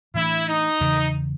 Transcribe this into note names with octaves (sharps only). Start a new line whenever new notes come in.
A2 E3 A3 D4 E4
D#4
E2 C#3 E3